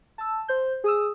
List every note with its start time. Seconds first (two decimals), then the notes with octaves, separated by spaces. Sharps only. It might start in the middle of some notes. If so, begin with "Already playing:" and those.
0.18 A5 E6
0.48 C5 G6
0.84 G#4 D#6 E6